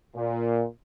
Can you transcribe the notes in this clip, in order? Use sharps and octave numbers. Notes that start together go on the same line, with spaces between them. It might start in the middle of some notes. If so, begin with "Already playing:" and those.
A#2